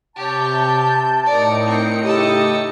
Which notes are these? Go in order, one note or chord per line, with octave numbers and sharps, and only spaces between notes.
C3 G4 C#5 A5 G6
A2 D#4 A#4 D5 C#7
C4 A#4
C#3 E4 G4 A4 D#5